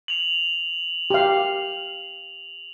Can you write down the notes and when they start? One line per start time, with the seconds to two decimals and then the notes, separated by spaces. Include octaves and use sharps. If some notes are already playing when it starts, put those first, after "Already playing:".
0.08 F7 F#7
1.10 G4 F5